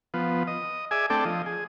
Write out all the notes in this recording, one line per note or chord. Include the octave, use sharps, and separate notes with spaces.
F3 B3
D#5
G#4 D5 E5 G#5
A3 C4 D4 A4 D5 G5
F3 D#5
G#4